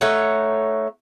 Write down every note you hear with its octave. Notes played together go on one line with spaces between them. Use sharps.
A3 D#4 C#5 F#5